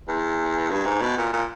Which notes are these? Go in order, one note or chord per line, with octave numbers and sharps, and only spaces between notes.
E2
G2
G#2
B2
A#2
A#2